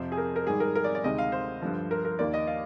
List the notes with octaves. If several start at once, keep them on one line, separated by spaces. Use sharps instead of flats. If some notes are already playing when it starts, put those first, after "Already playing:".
Already playing: F2 C3 F3 C5
G#4
A#4
A#4
G#2 D#3 G3 G#4
A#4
A#4
D5
D5
D2 C3 D#3 G#3 D#5
F5
C5
G2 D3 F3
A#4
A#4
D#2 D#3 A#3 D5
D#5
F5